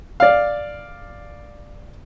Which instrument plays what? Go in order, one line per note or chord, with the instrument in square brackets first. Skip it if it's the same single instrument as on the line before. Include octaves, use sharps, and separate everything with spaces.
[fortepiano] D5 F5